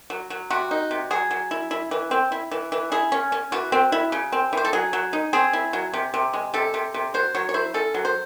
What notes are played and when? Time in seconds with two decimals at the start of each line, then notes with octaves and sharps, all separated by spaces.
0.10 F#3
0.30 F#3
0.50 C3 F#4
0.71 D#4
0.91 C3
1.11 F#3 G#4
1.31 F#3
1.51 E4
1.71 E4
1.91 E3
2.11 C4
2.32 E4
2.51 E3
2.72 E3
2.92 E4 G#4
3.12 C#4
3.32 C#4
3.52 E3 F#4
3.72 C4
3.92 E4
4.12 C#3
4.32 C4
4.53 E3 C5
4.65 A4
4.73 F#3 G#4
4.93 F#3
5.13 D#4
5.33 C4 G#4
5.53 E4
5.73 F#3
5.94 C3
6.14 C3
6.33 G#3
6.54 C3 A4
6.74 C3
6.94 C3
7.14 F#3 C5
7.35 F#3 C#5
7.49 C#5
7.54 E4 C5
7.74 C#4 A4
7.94 F#3
8.05 C5